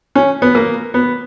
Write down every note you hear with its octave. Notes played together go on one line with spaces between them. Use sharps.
C#4
B3
A#3
B3